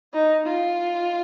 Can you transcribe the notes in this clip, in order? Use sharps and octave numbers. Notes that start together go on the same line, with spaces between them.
D#4
F4